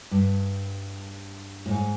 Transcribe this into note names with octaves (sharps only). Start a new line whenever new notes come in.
G2
A2
G#2